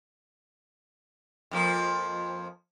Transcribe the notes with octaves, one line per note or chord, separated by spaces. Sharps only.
F2 F3 A#3